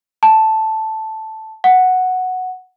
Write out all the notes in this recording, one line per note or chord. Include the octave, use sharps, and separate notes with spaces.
A5
F#5